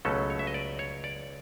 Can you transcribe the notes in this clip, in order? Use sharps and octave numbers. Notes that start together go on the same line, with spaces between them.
C#2 B2 F#3 A3 C#4 A4
C#5
E5
D#5
D5
C#5
D5